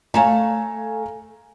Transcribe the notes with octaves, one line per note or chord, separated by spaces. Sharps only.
A3 A4 C#5 F5 G#5 A#5